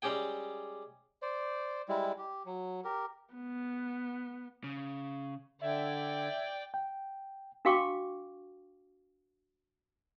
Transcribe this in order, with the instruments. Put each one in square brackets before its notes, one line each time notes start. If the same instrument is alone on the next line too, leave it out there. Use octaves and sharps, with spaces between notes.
[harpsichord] G3 G#3 C#4 G4 G#4 G5
[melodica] C5 D5
G3 G#3 E4
G4
F#3
G4 A#4
[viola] B3
[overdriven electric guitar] C#3
[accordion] D3 [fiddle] D5 G5 [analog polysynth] E5 G#6
[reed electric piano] G5
[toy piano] D4 F#4 F5 G5 C#6 D6